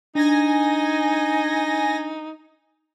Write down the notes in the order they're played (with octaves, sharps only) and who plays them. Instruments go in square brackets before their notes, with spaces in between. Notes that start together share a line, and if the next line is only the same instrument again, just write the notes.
[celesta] D4 [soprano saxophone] D#4 [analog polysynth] G#5 A#6